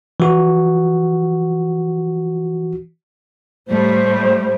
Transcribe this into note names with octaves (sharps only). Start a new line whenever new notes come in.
E3 F#4
A2 G3 A3 C5